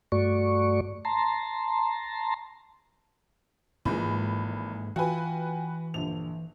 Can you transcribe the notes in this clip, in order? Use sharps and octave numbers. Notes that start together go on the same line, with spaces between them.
G2 A3 F#4 D5 C#6
A5 A#5 C6
G#1 G#2 E3 F3 G#3 A#3 B5
E3 F4 F#4 B4 G5 G#5
A#1 G2 D3 F7